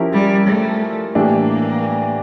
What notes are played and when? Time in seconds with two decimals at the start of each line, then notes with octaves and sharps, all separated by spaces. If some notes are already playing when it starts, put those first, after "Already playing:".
Already playing: F3 C#4 E4 G4 A#4
0.14 G3
0.47 A3
1.15 A2 E3 G3 A#3 D4 G4